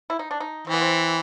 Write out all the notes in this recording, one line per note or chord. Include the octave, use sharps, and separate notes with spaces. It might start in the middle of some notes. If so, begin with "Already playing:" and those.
E4
D#4
D4
D#4
E3 C4
B3
C4